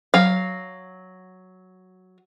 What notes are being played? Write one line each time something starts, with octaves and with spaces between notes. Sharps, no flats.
F#3 F5